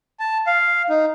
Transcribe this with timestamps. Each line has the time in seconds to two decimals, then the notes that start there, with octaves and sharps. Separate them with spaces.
0.20 A5
0.47 F5
0.89 D#4